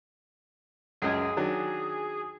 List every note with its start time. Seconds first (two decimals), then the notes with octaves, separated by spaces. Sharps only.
1.02 C#2 F#2 G#4 D#5
1.37 D#3 F#3 D4